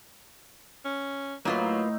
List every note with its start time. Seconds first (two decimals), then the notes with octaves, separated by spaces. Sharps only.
0.85 C#4
1.45 A2 F#3 A3 A#3 D#4 F4 B4